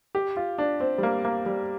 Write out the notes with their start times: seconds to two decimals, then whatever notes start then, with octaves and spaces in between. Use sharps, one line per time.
0.15 G4
0.37 F4
0.58 D4
0.80 C4
0.98 G3
1.03 A#3
1.25 A#3
1.46 G3